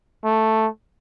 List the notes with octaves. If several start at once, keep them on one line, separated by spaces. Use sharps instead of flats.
A3